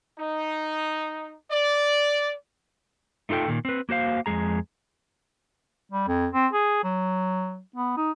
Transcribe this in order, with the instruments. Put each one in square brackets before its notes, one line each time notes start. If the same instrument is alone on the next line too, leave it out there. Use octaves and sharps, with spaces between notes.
[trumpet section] D#4
D5
[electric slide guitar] A3 D#4 F4 A4 G5
A#2 D#3
C4 B4
A#3 F#4 C5 F5
F2 B2 G#3 G#4 A#5
[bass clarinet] G3
F2
C4
G#4
F#3
B3
D#4